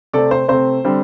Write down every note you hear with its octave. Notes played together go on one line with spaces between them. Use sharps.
C3 A3 C4 A4 D5
C5
C3 A3 C4 C5
D3 G3 C4